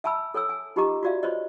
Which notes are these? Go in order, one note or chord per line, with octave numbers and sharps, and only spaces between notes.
E5 G#5 A5 B5 E6
A4 C#5 G#5 E6
G#5
D#4 F4 G4 D#5 A#5 D6
F4 F#4 D5 E5 F5
F4 C5 C#5 D#5